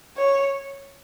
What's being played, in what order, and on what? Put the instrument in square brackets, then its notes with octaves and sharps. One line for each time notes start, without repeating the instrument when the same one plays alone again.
[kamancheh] C#5